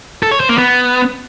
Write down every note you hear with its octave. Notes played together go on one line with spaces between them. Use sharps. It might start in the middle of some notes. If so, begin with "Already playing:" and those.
A4
C#5
C5
A#3
B3